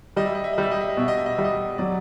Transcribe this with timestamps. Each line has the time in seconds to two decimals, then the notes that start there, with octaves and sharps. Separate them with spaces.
0.16 G3 D#5
0.26 E5
0.35 D#5
0.44 E5
0.53 D#5
0.58 G3 E5
0.71 D#5
0.81 E5
0.89 D#5
0.97 B2 E5
1.08 D#5
1.17 E5
1.26 D#5
1.35 G3 E5
1.44 D#5
1.78 F#3 D5